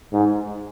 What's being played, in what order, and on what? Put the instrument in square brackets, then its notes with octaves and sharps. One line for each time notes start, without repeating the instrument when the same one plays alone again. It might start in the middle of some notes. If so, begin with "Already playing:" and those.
[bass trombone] G#2